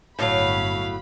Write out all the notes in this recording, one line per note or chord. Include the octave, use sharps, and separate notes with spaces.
G1 A2 F#3 F5 B5